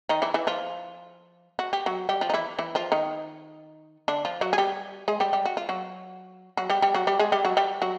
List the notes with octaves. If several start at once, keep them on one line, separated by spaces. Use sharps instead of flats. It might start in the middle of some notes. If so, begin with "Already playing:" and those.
D#3 D#4
E3 E4
E3 E4
F3 F4
F#4
G4
F#3 F#4
G3 G4
F3 F4
D#4
E3 E4
E3 E4
F3 F4
D#3 D#4
D3 D4
F3 F4
F#3 F#4
G#4
G3 G4
G#3 G#4
G3 G4
G3 G4
F#4
F4
F#3 F#4
F#3 F#4
G3 G4
G3 G4
F#3 F#4
G3 G4
G#3 G#4
G3 G4
F#3 F#4
G3 G4
F#3 F#4